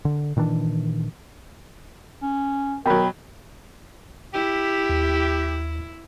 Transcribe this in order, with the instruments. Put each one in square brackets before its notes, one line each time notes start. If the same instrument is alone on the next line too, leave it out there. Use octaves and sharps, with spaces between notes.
[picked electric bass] D3
A#2 D#3 E3 D4
[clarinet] C#4
[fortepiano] B2 F#3 [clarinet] A#4 [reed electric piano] G5 B5
[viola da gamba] E4 [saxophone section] G4
[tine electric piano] D#2